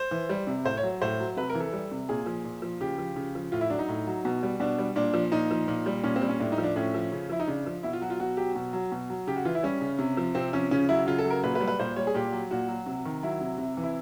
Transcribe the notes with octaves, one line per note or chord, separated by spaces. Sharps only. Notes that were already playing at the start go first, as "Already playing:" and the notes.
Already playing: C5
E3
G3
C3
A2 C5
C#5
F#3
A2 C5
F#3
C3 B4
A#4
E3
A4
G3
C3
A#2 G#4
F3
A#2
F3
C#3 G4
F3
C#3
F3
A2 F4
E4
F#3 D4
D#4
A2
F#3
B2
G3
B2 D4
G3
A#2 D4
F3
A#2 D#4
F3
A#2
G3
A#2 C#4
C4
G3
C#4
A2 D4
D#4
F3
D4
A2 C#4
F3
C#3
F3 E4
D#4
C#3 D4
F3
B2 E4
F4
F#3 F#4
F4
B2 F#4
F#3 G4
B2
F#3
B2
F#3
C#3 G4
F#4
E3 F4
E4
G3 C#4
C#3
C3
F3
C3 C4
F3 C#4
C#3 C#4
F#3 E4
C#3 F4
A4
F#3
A#4
A#2 B4
B4
G3
B4
A#2 C5
G3 C#5
G#4
A#2 G4
F#3
A#2 F#4
F#3
C3
D#3
F#3 E4
C3
C3
E3
E4